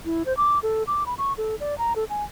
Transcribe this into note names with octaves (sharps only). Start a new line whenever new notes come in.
E4
C5
D6
A4
D6
B5
C#6
A4
D5
A#5
A4
G#5